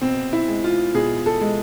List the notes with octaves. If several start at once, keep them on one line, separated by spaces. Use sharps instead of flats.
B2 C4
E4
G#3
F4
B2 G#4
A4
G#3